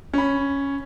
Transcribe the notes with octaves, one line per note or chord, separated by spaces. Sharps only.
C#4 B5